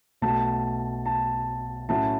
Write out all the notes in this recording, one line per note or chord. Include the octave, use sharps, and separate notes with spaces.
B1 B2 A3 A5
A5
A2 F#3 A3 C#4 E4 A5